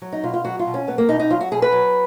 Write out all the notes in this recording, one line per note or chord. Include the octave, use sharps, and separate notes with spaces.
F#3
D#4
B2 F4
F4
F#3 F#4
F4
B2
C#4
F#3 B3
A#3
B2 D#4
D#4
F#3 F4
F#4
B2 G#4
B4
F#3